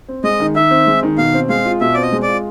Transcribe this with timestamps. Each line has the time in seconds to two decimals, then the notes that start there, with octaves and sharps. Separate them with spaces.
0.08 C4
0.24 G#3 D#5
0.40 D#3
0.55 D#3 E5
0.71 C4
0.87 G#3
1.03 D#3
1.18 B2 F5
1.34 C4
1.49 G#3 F5
1.65 F4
1.81 B2 E5
1.94 C4 D5
2.02 D#5
2.13 G#3
2.23 D5
2.28 F4